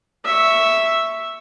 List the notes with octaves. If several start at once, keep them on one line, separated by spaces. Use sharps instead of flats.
E5 C#6